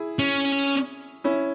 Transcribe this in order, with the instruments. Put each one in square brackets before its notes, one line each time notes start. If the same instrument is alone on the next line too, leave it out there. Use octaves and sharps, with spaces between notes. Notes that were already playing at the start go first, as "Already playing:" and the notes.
Already playing: [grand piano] E4 G#4
[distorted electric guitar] C#4
[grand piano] C#4 E4